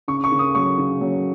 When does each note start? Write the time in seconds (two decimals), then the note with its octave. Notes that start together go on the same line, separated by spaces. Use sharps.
0.08 C#3 C#6
0.24 C#6
0.32 C#3
0.39 D#6
0.55 F#3 C#6
0.78 C#3
1.01 F#3